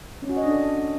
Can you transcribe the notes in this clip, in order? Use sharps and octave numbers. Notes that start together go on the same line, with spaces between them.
C#4
F#4
D#5
D4
A4